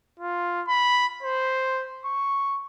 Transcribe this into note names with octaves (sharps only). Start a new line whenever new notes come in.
F4
B5
C5
C#6